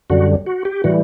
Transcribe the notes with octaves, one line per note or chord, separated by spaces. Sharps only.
F#2 D3 G3 F#4
F#4
G4
A2 E3 G3 F#4